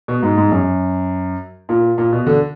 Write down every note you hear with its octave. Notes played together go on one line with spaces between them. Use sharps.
B2
G#2
G#2
F#2
A#2
A#2
B2
D3